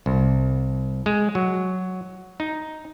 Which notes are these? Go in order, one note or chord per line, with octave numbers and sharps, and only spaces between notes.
C2
G#3
F#3
D#4